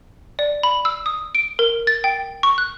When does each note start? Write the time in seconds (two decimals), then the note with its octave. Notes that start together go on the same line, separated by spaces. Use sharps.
0.39 D5
0.63 B5
0.85 E6
1.06 D#6
1.35 D7
1.59 A#4
1.87 A6
2.04 G5
2.43 C#6
2.58 F#6